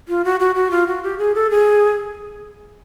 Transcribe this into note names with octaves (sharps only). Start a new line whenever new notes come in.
F4
F#4
F#4
F#4
F4
F#4
G4
G#4
A4
G#4